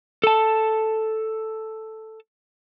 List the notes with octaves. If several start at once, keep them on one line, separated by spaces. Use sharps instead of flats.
A4 A5